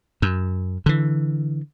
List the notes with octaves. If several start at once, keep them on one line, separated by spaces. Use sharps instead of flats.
F#2
D3 E3